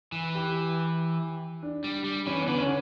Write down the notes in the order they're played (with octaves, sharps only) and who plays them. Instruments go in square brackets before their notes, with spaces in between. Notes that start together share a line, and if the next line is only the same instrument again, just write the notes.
[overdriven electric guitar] E3
[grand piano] G4
D4
[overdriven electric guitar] G3
G3
[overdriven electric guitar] E3 [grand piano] C#4
[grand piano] B3
[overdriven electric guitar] D3
[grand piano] C#4